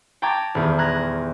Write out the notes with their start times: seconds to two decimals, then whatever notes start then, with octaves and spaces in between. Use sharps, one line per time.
0.22 G5 A5 A#5 C#6 D6 G#6
0.55 D#1 E2
0.78 A#5 F#6 G#6 A#6